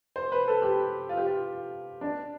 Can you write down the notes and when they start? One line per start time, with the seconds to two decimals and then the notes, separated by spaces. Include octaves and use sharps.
0.16 C5
0.32 B4
0.48 A4
0.62 G4
1.09 F4
1.17 G4
1.27 F4
2.01 D4